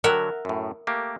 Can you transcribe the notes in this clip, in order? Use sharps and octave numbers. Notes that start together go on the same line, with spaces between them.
D3 F#3 A#4 E5 F#5
F#2 A2
A3 A#3 G4